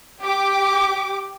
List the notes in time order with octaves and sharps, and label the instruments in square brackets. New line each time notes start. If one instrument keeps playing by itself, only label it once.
[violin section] G4 G5 D6